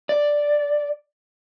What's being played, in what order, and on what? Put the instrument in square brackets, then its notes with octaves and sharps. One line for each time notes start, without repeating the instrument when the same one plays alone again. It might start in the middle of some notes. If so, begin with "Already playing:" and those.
[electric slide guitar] D5